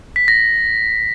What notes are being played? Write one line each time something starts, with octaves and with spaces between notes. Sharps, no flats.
B6
A#6